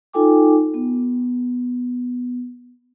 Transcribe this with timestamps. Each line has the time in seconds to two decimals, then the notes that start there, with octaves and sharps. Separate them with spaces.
0.13 D#4 F4 A4 G5 G#5 D6
0.74 B3